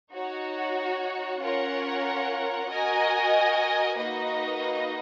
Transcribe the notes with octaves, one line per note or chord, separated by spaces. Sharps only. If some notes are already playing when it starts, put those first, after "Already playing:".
D#4 F#4 C#5
C#4 F4 A#4 C#5 F#5
F#4 A#4 D#5 G#5
A#3 D#4 F#4 B4 D#5